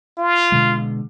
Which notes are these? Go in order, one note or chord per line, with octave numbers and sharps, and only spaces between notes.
F4
B2 D3 G#3